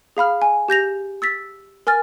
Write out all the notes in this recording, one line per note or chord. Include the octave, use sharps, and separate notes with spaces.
G#4 F5 B5 F6
G#5
G4 G6 A#6 F7
E6 A6 B6
A#4 G#5 F6 A6